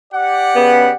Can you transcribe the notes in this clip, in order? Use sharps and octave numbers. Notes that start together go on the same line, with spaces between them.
G4 D5 F#5
C#3 B3